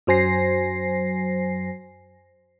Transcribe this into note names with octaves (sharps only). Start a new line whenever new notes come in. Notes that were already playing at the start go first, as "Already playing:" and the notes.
F#2 F#3 C5 G#5 A#6 C7